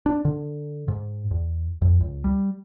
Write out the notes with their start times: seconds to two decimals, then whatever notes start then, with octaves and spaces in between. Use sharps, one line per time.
0.06 D4
0.25 D3
0.88 G#2
1.31 E2
1.82 F2
2.01 C#2
2.24 G3